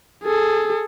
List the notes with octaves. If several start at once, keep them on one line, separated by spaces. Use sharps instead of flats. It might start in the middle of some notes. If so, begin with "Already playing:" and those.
G#4 A4